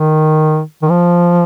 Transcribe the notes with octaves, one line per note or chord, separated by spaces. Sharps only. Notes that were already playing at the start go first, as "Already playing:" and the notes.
Already playing: D#3
D#3
F3